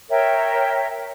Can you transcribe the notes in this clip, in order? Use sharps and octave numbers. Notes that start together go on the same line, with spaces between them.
A#4 C#5 E5 G5